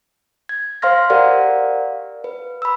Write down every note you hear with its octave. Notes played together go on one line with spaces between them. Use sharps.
G#6
C5 F5 C6 F6 A#6
G4 A#4 D5 F5 F#5
B4
B5 E6